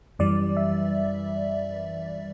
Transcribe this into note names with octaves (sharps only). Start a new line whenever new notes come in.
F#2 E3 G3 D5
E5